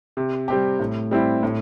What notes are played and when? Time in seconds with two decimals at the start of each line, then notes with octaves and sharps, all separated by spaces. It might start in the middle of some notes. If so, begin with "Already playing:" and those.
0.17 C3
0.48 G3 C4 G4
0.80 A2
1.11 G3 C4 E4
1.43 A2